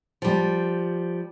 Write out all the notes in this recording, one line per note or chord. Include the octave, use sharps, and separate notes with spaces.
F3 G3